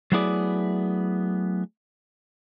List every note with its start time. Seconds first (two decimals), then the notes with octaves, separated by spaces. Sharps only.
0.12 F#3 A3 B3 E4 G#4 D5